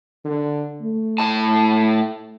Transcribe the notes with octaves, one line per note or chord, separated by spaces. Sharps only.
D3
A3
A2 A5